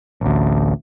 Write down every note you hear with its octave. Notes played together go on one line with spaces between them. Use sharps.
A1 D2